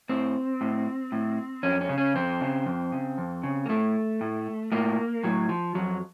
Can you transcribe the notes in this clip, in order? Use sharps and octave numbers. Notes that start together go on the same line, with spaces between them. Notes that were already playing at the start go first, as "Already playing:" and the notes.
A2 C4
A2
A2
F2 C#4
C#4
C#3
C#4
F2 C4
C#3
F2
C#3
F2
C#3
A#3
A2 A3
A2
A2 A#3
A2 F#3
F3
F2 F#3